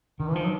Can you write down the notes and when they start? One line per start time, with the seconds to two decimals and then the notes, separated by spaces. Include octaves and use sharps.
0.19 D3 D#3
0.28 E3
0.35 D#3 F3
0.44 F#3